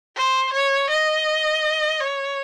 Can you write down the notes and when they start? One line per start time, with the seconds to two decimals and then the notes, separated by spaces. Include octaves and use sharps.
0.16 C5
0.53 C#5
0.89 D#5
2.00 C#5